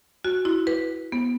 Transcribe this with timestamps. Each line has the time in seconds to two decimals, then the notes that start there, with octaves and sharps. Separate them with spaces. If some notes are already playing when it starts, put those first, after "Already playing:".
0.24 F#4
0.45 E4
0.67 B4
1.12 B3